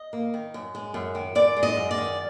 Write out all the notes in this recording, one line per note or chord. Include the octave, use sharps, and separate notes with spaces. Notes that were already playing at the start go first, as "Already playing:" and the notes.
Already playing: D#5
A#3
D#3
F#2
G#3
F#2
D#3
F#2 D5
G#3
D#5
F#2
D5
D#3